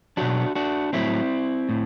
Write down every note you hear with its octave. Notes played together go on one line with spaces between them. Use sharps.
B2 F#3 D4 F#4
D4 F#4
A2 F#3 C4 E4
A2